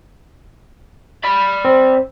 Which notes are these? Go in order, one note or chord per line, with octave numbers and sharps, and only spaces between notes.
D5 B5
C4